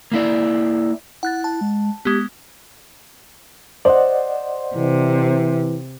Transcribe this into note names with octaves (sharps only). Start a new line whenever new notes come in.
A#3 E4 D5
E4 F#5 F#6 A6
A5
G#3
G#3 B3 G4
C5 D5 D#5 F#5
C3 E3